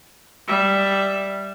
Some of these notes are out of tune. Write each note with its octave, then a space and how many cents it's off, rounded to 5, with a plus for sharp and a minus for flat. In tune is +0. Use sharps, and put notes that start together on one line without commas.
G3 +0 E5 +0